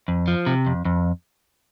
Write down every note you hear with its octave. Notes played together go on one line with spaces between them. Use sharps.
F2
F3
C3
F2
F2